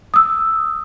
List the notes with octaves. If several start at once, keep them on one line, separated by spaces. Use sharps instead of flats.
D#6 E6